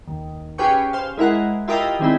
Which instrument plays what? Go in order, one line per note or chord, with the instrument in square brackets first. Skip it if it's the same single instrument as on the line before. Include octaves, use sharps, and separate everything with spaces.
[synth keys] D#2
C#4 G4 G#4 B4 G5 C#6
C5 F5
G#3 E4 A#4 F#5
E4 F4 G4 A#4 D#5 E5
D#3 G3 G#3 C4 D#4 E4